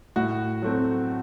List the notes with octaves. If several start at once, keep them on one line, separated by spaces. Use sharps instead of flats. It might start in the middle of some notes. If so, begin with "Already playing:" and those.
A2 F#4
F#3 A3 C4